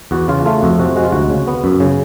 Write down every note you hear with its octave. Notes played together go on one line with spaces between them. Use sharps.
E2 F#4
C#3 F4
A3 F4
F2 F#4
C3 F#4
G#3 F#4
F4
D2 F#4
C#3
B3
F#2
C#3